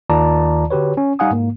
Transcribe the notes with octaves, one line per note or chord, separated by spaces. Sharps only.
D#2 D#3 F4 D5 A5 A#5
D3 F#4 G4 B4 C#5
C#4
G3 D#4 F5 F#5 G#5 D#6
G#2 A#3